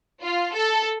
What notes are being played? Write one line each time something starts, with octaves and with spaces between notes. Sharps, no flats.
F4
A4